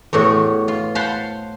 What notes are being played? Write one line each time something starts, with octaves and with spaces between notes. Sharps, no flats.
E2 A2 F#4
F4
C5 F5 F#5 A5 B5 C6